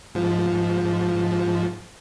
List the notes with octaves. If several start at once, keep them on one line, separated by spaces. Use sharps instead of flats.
G#2 F3